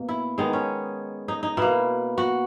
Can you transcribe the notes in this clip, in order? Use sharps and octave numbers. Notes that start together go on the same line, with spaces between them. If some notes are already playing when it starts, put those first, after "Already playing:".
Already playing: B2 A#3
E4
D#3 G#3 B3 D#4
C#4
D#4
D#4
B2 A#3 E4
F#4